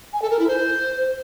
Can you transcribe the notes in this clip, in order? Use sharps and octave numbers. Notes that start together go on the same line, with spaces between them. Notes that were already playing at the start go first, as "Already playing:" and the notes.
G#5
A4
A#4
E4
C5